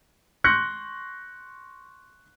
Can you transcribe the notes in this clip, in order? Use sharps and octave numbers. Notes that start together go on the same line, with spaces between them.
C6 C#6 F#6 G6 A#6 C#7